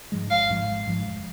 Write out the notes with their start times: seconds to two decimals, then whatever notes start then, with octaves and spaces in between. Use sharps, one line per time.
0.12 G#2 F3 G#3
0.30 G#1 F5
0.50 G#2 F3 G#3
0.68 G#1
0.87 G#2 F3 G#3
1.06 F1